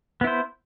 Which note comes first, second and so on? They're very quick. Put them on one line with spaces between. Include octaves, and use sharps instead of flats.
B3 E4 C5